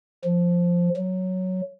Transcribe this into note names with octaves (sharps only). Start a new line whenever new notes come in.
F3
F#3